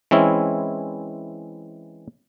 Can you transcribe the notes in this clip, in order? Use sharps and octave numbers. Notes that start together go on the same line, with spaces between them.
E3 G#3 C4 C#4 E4